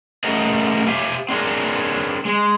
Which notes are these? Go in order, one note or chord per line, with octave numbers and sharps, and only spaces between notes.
A3 C#4 G#4 A#4 D#5 F#5
G4 C5 E5 F5 G#5
C4 D4 G#4 A#4
G#3